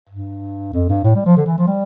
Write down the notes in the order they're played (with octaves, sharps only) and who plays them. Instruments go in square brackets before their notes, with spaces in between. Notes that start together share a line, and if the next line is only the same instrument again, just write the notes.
[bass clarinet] G2
F2
G2
A2
G3
F3
D3
E3
F3
G3